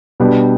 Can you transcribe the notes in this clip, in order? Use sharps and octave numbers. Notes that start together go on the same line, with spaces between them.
B2 G3 B3 D4 G4